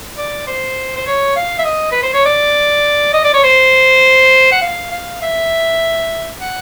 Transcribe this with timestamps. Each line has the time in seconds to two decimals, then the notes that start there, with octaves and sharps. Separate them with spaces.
0.18 D5
0.47 C5
0.96 C5
1.07 C#5
1.36 F5
1.59 E5
1.65 D#5
1.92 B4
2.03 C5
2.14 C#5
2.25 D5
3.13 D#5
3.24 D5
3.34 C#5
3.44 C5
4.52 F#5
4.62 F5
4.91 F5
5.22 E5
6.40 F#5